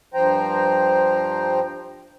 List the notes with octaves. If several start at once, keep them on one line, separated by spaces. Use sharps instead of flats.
G2 F3 C5 G5 A#5